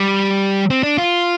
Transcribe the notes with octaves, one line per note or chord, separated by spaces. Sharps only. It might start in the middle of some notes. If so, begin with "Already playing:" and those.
Already playing: G3
C4
D4
F4